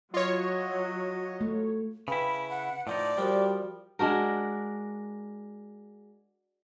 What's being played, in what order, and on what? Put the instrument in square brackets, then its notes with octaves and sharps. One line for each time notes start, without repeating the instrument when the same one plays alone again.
[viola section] F#3 [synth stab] F4 C#5 [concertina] D#5
[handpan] A3
[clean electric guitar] C#3 E4 [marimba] B4 F5 G5 [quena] B5
[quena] F#5
[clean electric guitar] A2 F3 D#4 [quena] D5
[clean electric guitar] F3 [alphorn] G3 [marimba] F#4 A#4 C5
[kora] G#3 D4 F#4 A#4